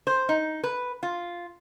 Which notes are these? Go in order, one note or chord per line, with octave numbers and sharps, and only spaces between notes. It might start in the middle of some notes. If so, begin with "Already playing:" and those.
C5
D#4
B4
F4